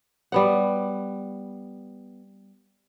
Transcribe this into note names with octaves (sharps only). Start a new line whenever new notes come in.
G3 B3 F#5